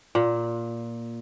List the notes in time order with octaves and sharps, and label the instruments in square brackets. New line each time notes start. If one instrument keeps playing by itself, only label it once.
[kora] A#2